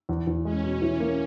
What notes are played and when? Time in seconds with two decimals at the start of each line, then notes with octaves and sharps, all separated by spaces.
0.09 E2
0.27 E2
0.45 G#3 C#4
0.64 B2
0.82 E3
1.00 A#3